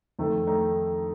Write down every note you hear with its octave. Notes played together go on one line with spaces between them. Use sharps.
F2 D#3 A3 D#4
D#3 A3 D#4